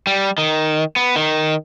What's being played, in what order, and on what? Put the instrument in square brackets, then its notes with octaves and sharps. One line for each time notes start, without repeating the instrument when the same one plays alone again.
[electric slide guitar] G3
D#3
B3
D#3